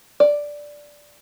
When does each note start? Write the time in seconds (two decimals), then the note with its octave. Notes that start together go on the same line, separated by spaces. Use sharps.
0.20 D5